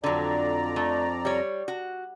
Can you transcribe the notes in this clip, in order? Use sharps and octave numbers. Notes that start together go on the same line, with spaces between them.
F2 D3 F#3 D5 A#5
A3
G3 C#5
F#4